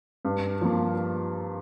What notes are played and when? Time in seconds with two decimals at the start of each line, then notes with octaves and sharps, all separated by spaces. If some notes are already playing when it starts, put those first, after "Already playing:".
0.25 G2
0.61 F3 A#3 F4